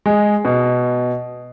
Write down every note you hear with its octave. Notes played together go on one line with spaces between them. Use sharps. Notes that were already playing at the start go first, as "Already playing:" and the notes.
G#3
B2